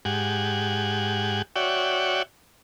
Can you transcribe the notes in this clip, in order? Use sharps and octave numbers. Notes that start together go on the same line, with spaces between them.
G#2 G4 F#5 G#5
F#4 C#5 D5 E5 F#5 G5